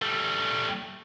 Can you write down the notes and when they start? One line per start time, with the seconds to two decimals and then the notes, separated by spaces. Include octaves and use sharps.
0.02 G3 A3